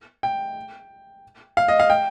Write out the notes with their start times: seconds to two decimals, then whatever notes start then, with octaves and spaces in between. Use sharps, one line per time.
0.23 G5
1.57 F5
1.68 D#5
1.80 F5
1.90 G5